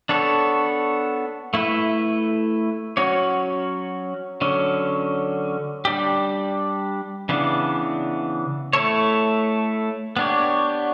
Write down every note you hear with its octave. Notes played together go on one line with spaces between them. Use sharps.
B3 D4 A4 C#5
A3 E4 B4
F#3 C#4 F#4 C#5
D3 F#3 C#4
G3 D4 G4
C#3 E3 B3 D4
A3 E4 A4 C#5
B3 D4 G4 C#5